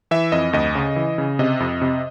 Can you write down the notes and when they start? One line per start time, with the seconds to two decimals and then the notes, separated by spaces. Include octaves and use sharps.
0.11 E3 E5
0.32 F2 D#5
0.53 D2 D#5
0.75 C#3
0.96 E3
1.18 C#3
1.39 C3 D#5
1.60 F2
1.81 C3